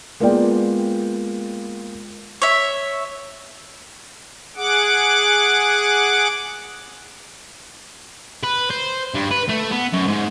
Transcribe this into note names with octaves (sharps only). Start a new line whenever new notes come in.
G#3 A#3 B3 F4 D5 G5
C#5 E5
G#4 F#5 D6
B4
C5
G2
B4
A3
B3
F#2
G#2